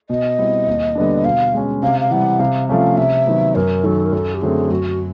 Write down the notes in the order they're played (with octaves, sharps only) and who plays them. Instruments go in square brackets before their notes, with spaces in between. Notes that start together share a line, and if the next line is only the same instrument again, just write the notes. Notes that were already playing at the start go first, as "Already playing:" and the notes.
[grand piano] B2 [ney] D#5
[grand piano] G3 C4 E4
D#2
D3 G3 B3 D4
[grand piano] B2 [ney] F5
[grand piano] G#3 C#4
[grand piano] C3 [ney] F5
[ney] F5
[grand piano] E3 G3 [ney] F#5
[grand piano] C3 [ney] F5
[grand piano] F3 A3 C#4 [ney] F5
[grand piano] C3 [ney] E5
[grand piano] D#3 F#3 B3
[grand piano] F#2 [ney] A#4
[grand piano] D#3 F#3 [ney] A4
[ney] A#4
[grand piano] F#2 [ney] A4
[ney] G4
[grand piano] D3 F#3 A3 C4 [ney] G#4
[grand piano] F#2 [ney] F#4